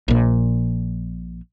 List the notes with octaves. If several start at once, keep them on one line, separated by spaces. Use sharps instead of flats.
A#1 A#2